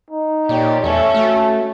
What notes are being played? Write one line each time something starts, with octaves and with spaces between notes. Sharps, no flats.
D#4
A#2 G4 C#5 D5
E2 A3 C#4 A4 E5
A3 F#4